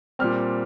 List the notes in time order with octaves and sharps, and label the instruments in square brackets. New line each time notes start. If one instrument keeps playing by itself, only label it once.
[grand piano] A#2 G3 C4 F6